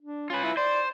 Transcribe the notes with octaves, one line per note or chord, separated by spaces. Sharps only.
D4
C#4 F4 B4
E4
C5 D5